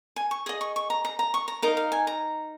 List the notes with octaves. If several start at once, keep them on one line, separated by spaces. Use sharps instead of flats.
G#5
C#6
G#4 D#5 D#6
C#6
C#6
A#5
A#5
A#5
C#6
A#5
D#4 A#4 D#5 F5
F5
G#5
A#5